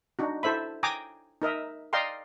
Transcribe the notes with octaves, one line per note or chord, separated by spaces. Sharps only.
D4 D#4 F#4
E4 A4 C5 E5 B5
G5 G#5 A#5 D6 D#6
D#4 A#4 D#5 E5
D5 D#5 F5 G5 A#5 C6